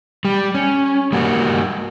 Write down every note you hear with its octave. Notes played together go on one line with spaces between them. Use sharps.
G3
C#4
G3 A#3 F#4